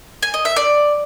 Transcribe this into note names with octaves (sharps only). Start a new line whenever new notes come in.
G#5
D#5
E5
D5